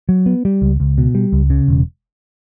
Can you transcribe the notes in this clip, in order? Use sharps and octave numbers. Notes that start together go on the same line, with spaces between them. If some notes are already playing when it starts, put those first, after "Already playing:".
F#3
B3
G3
C#2
C#2
B2
G3
C#2
C#3
E1